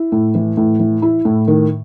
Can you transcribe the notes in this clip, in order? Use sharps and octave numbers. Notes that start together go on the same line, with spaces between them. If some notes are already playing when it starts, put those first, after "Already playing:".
Already playing: E4
A2
E3
A2
E3
E4
A2
D#3